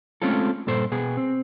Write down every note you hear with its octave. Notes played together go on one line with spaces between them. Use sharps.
G#3 A3 C4 C#4 F4 A4
G2 A#2 A4 C5
B2 B3 G#4
C4